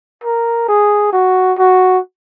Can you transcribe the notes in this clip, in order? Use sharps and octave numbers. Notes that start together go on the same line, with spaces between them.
A#4
G#4
F#4
F#4